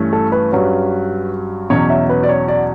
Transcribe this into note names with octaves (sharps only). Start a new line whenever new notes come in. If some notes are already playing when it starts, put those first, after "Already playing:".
Already playing: G2 E3 A3 C#4
A4
B4
G2 F#3 C#4
E2 B2 F#3 C#4 C#5
E5
B4
D5
C#5
D5